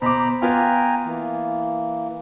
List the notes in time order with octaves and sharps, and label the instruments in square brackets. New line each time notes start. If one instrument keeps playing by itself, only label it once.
[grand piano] B2 D6 [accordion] C5 A#5 B5
[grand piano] B3 F4 [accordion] G5 G#5 A#5
[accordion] E3 A#3